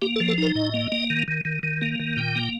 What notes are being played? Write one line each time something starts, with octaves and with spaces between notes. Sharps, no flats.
A#3 G4
A4
F3
A4
D#4 A#4
A2 D#5
A#3
A#3
D#3
D#3
D#3
D#3
A#3
D#3
A#2 G5
A#3